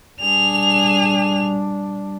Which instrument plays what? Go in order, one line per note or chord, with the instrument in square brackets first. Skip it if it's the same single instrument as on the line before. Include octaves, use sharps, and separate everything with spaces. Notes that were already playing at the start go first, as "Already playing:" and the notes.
[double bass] G3 D4 [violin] G#4 F7